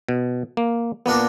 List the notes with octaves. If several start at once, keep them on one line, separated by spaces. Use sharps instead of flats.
B2
A#3
A#2 A#3 B3 D4 A#4